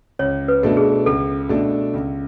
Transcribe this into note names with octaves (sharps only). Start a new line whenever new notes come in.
C#2 C#5
B4
B2 A3 D4
G#4
C#2 A4
B2 A3 D4
C#2